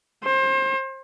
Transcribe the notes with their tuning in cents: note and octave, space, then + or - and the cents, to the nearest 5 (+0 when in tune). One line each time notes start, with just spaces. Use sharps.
C5 +30